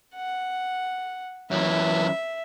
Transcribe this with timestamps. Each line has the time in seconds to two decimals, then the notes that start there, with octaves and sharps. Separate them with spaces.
0.15 F#5
1.51 F#2 E3 E5